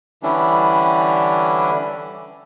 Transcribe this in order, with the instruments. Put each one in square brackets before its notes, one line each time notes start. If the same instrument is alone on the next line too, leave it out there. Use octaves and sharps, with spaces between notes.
[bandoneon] D3 E3 G3 C#4 D4 E4